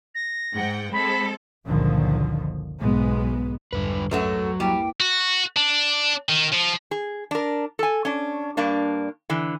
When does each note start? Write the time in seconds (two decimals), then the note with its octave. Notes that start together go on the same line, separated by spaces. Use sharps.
0.15 A#6
0.54 G#2 F#5 G5
0.93 G#3 C4 A4 B5
1.66 F#1 C#2 A#2 D3 D#3 F3
2.80 B1 G#2 G#3 B3
3.73 B1 F2 G#2 D3 G3 B4
4.11 F#2 F#3 A3 F#4 B4
4.60 G3 A#3 E4 G5
5.00 F#4
5.56 D4
6.29 D#3
6.53 F3
6.91 G#4
7.31 D4 A#4
7.79 A4 G#5
8.05 C#4 D4
8.57 G2 A#3 D4
9.30 D3 E3